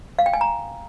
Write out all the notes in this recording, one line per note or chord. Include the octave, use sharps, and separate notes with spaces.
F5
G5
G#5
A#5